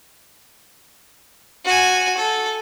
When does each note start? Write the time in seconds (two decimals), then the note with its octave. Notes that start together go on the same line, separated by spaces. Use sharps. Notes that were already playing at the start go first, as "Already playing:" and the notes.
1.65 F#4 G#5
2.17 A4